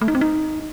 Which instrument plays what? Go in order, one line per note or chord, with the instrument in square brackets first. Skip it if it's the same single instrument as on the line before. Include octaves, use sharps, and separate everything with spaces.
[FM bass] A3
D#4
C4
D#4